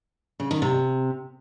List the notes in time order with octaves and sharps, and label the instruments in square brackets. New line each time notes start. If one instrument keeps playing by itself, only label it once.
[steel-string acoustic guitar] C#3
D#3
C3